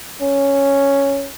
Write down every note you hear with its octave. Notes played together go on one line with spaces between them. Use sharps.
C#4